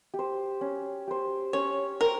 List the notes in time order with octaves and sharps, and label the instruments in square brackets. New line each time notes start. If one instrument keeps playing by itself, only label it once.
[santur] G4
C5
C#4
G4 C5
[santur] C#4 [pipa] C#5
[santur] G4 C5 [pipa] A#4